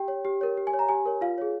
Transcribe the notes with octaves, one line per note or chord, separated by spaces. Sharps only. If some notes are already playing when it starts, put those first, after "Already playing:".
Already playing: G4 G5
C#5
G4
A#4 C#5
G4
G#5
C#5
A#5
G4 G#5
A#4 C#5
F4 F5
G#4 C#5